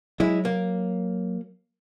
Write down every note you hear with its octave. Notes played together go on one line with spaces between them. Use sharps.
F#3 G#3 E4
A#3